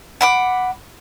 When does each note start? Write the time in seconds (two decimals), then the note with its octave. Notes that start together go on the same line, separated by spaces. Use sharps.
0.21 F#5 B5 D6